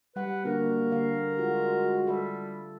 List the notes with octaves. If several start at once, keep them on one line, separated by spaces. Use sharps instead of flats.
G3 B4 F#5
D3 A#3 D4 F#4 A#4
D3 F5
G#3 F4 F#4
G3 A4 E5